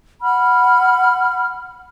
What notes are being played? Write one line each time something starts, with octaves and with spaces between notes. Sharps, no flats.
F#5 B5 F6